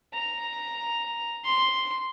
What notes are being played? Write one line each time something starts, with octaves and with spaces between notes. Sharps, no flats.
A#5
C6